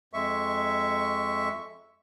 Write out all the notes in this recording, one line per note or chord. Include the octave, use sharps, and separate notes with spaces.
F2 G#3 E5 C#6